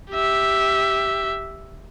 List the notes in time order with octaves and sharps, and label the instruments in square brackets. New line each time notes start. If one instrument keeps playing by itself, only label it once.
[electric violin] G4 E5